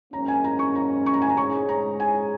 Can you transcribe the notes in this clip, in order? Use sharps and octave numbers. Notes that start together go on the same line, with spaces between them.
G#1 F#2 D#3 A#3 C#4 A#5
G#5
A#5
C#6
A#5
C#6
A#5
G#5
A#5
G#2 G#3 C#4 G#4 C#5 C#6
A#5
G#5